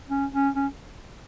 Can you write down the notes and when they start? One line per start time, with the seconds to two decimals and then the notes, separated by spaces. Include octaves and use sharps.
0.10 C#4
0.33 C#4
0.56 C#4